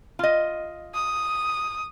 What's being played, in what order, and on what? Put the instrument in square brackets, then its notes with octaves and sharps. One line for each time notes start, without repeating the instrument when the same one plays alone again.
[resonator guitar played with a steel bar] F4 D#5
[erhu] D#6